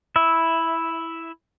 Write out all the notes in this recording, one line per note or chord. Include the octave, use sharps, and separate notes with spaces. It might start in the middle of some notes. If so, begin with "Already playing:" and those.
E4 E5